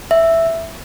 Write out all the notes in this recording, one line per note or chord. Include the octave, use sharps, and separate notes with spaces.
E5